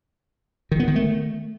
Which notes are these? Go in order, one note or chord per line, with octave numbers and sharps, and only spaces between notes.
D#3
B3
D#3
A3